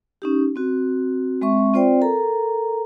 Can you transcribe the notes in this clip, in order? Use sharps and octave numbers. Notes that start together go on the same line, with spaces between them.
C#4 D#4 G4
C4 F#4
G#3 C4 E5 C#6
C4 F4 C5 D5 G5
A4 A#4 A#5